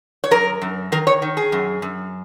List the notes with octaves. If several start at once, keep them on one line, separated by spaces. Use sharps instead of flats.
C#5
F#2 A#4
F#2
D#3 A#4
C#5
D#3
G#4
F#2
F#2